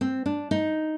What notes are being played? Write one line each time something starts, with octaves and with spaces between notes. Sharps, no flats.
C4
D4
D#4